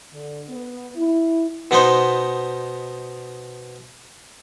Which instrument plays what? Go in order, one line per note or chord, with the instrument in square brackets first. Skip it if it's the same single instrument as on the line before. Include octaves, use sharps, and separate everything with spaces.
[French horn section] D3
B3
E4
[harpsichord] B2 B3 D#4 C5